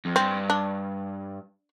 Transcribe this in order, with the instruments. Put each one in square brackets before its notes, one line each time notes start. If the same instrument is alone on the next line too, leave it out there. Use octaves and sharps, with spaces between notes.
[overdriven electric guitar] F2
[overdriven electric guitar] G2 [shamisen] C4
[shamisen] D4